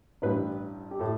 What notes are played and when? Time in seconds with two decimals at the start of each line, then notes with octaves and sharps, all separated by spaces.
0.22 A1 G2 G3 B4
0.91 G4
0.99 A2 A3 E4 A4